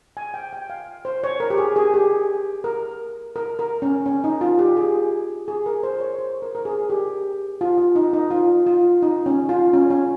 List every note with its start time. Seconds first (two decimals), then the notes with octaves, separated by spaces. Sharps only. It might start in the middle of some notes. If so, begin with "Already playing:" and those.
0.17 G#5
0.34 G5
0.53 G5
0.70 F5
1.05 C5
1.24 C#5
1.40 A#4
1.50 G4
1.58 G#4
1.76 G#4
1.94 G4
2.64 A#4
3.36 A#4
3.59 A#4
3.82 C#4
4.06 C#4
4.24 D#4
4.41 F4
4.59 G4
4.77 G#4
5.48 G#4
5.66 A#4
5.83 C5
6.00 C#5
6.19 C5
6.42 A#4
6.55 A#4
6.65 G#4
6.90 G4
7.61 F4
7.78 F4
7.96 D#4
8.13 D#4
8.31 F4
8.66 F4
9.02 D#4
9.26 C#4
9.49 F4
9.73 C#4
9.90 C#4